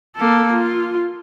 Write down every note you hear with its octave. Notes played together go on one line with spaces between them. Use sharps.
A#3 A4
F4